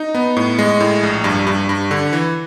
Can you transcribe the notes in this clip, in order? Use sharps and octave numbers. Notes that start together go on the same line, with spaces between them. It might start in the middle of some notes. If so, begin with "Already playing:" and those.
Already playing: D#4
B3
A2
G#3
A2
A#1
G2
G2
G2
D3
E3